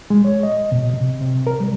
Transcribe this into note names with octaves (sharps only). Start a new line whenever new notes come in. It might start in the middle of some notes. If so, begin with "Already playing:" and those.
G#3
C#5
D#5
B2
C3
C3
A#4
G3